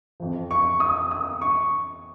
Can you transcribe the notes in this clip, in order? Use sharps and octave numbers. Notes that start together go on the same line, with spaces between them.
F2 F3
C#6
D#6
D#6
C#6